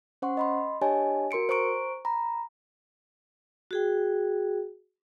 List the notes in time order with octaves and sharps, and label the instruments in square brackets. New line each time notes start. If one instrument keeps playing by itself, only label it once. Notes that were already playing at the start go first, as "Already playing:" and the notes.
[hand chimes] C#4 C5 F#5 C6 C#6
D#5 B5 C6
D4 G4 C#5 D#5 G#5 A5
F#4 A#4 C6 C#7 D7
C5 A#5 C#6 D7
A#5 B5
[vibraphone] F#4 G#4 G5